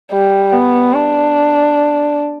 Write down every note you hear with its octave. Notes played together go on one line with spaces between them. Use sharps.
G3
B3
D4